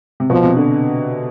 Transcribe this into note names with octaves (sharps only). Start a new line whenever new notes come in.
C3
B2 F3
C3
D3